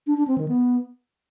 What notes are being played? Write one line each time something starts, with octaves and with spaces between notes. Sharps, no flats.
D4
D4
C4
D#3
B3